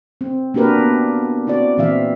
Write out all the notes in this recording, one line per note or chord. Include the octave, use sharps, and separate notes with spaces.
C4
A#3 D4 F#4 G4 A#4 B4
B3
C4 E4 F#4 D5
A#2 E3 C4 E5 F5